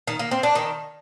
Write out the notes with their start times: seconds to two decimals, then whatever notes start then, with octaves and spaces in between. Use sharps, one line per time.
0.07 D#3
0.19 A#3
0.31 C4
0.43 D4
0.55 D#3